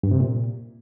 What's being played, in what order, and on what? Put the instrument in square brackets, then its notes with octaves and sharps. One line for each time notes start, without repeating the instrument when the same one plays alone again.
[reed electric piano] G2
C3
A#2